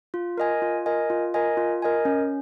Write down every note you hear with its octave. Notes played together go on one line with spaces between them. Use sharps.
F4
A#4 D#5 G#5
F4
A#4 D#5 G#5
F4
A#4 D#5 G#5
F4
A#4 D#5 G#5
C#4